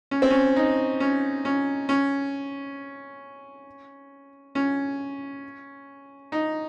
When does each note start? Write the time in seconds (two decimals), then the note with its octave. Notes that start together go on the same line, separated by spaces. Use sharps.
0.11 C#4
0.22 C4
0.30 C#4
0.56 D#4
1.00 C#4
1.45 C#4
1.89 C#4
4.55 C#4
6.32 D#4